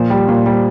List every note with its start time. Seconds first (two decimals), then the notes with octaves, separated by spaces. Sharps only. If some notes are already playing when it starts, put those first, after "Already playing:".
Already playing: A#2 F3
0.10 G3
0.29 A#2
0.46 G3